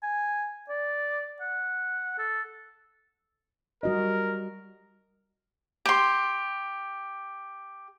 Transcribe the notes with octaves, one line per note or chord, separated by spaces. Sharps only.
G#5
D5
F#5
A4
G3 F#4 A#4 D#5
G4 C6